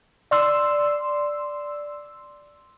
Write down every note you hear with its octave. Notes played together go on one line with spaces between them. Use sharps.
D5 C6 E6